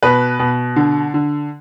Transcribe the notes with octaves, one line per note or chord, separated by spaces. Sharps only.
B2 B4
B2
D3
D3